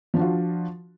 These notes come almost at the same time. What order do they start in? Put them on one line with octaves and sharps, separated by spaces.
F3 D4 F#4 F4